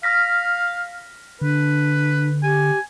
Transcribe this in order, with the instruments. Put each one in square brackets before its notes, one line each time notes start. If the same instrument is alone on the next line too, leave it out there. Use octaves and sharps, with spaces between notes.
[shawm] F5 [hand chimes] F6 A#6 B6
[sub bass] D3 [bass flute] D4 [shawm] B4
[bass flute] G4 [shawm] G#5